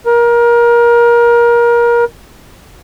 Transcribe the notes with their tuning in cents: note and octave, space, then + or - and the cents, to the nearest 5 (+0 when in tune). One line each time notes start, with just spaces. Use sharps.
A#4 +25